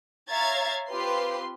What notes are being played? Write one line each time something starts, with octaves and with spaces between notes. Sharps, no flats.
C#5 E5 F5 A#5 G#6 A6
C4 F4 G4 B4 C6